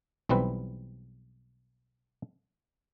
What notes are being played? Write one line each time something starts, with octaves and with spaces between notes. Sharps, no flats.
B1 E3 G3 C4 B4